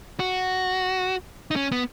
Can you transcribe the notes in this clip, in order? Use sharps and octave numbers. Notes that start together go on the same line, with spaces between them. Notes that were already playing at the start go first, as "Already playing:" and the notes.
F#4
D#4
C#4
B3